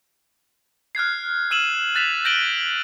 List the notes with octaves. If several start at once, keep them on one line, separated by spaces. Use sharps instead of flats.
F6 F#6 G#6 C7
E6 F6 D#7 E7 F#7
F#6 A6 B6 E7 F7
G6 A#6 D7 D#7 F#7 G7